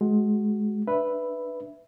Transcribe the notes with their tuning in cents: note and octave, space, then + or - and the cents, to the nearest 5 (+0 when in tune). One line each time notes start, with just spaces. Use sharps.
G#3 +20 F#4 +0
D4 -5 B4 +0 E5 +0